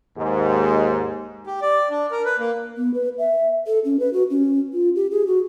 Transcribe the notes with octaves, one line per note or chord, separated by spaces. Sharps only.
D#2 G#2
G4
D5
D4
A#4
B4
A#3
B3
B4
E5
A4
C#4
B4
F#4
C#4
F4
G4
G#4
F#4